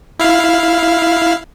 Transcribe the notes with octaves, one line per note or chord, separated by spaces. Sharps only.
E4 F5